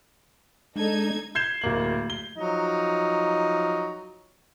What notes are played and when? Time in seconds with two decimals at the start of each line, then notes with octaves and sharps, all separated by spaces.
0.76 G#3 D4 D#4 A4 G#6
1.35 G6 G#6 C7 E7 G7
1.61 D1 A#3 F#7
2.10 G7
2.37 F3 F#3 D#4